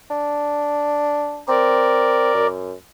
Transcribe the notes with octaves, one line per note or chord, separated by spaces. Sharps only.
D4
C4 A#4 D5
F#2